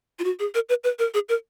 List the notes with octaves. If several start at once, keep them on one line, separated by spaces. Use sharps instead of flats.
F4
F#4
G#4
A#4
B4
B4
A#4
G#4
A#4